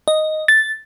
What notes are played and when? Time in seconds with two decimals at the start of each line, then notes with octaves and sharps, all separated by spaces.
0.08 D#5
0.48 A6